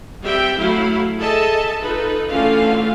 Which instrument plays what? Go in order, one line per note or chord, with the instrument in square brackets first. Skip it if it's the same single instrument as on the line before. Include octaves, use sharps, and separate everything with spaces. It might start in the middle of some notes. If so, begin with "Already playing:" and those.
[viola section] G3 C4 E5 G5
F#3 A3 E4 F5
G#4 A4 D#5 E5 A5
D#4 F4 A4 B4
D3 E3 A3 C#4 F4 F5